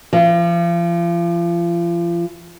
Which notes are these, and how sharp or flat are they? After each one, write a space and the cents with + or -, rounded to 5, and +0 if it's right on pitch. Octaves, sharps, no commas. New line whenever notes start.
F3 -35